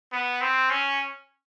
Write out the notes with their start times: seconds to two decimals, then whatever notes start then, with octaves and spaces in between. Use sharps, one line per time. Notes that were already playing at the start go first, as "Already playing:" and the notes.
0.12 B3
0.41 C4
0.70 C#4